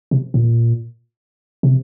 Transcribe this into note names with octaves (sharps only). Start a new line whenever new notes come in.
C3
A#2
C3